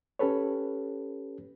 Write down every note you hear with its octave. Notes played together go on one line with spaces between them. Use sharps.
C#4 G4 A4 B4 C#5